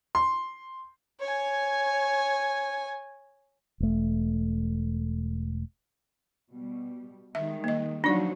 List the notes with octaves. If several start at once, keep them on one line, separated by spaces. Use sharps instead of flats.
C6
C#5 G#5
E1 A3
B2 G3
D#3 G3 G#3 E5
A#3 D#5
F3 F#3 D4 D#4 F#4 D5